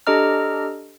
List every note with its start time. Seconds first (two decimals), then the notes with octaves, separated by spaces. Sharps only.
0.07 D4 G4 A4 D#5 A#5 F6